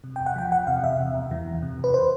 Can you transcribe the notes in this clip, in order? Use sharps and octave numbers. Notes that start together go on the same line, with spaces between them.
C3
E2 G5
F#5
F3 G5
E2 F#5
C3 F5
E2 E5
C3
E2
E3
E2
C3
E2
B4
C5